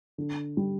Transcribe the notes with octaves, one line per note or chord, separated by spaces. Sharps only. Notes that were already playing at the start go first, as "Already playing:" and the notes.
D3
G3